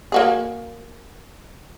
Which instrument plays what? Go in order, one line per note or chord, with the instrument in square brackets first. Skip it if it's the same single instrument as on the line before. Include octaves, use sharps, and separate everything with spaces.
[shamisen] A#3 F#4 G#4